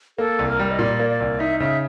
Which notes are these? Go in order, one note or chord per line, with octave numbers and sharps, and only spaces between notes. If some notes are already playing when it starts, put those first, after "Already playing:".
A#3 A4
C2
A#4
G3
D#5
A#2 D5
A#3
D5
C2
D#4 E5
C#3 E5